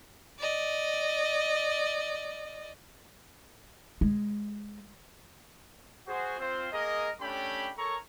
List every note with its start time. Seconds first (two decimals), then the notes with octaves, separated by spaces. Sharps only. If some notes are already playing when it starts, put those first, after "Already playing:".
0.39 D5 D#5
4.01 G#3
6.07 F#4 G#4 C5
6.39 C4 F4 C5
6.72 A#3 G#4 A#4 D#5
7.21 A3 C#4 D4 G4 G5 B5
7.77 A4 A#4 C#5 A#5 C#6